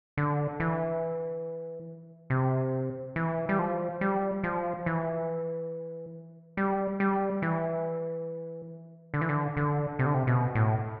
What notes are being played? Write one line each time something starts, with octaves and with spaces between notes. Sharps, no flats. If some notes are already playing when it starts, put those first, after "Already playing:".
D3
E3
C3
E3
G3
F3
G3
F3
E3
G3
G3
E3
D3
E3
D3
D3
C3
D3
C3
B2
A2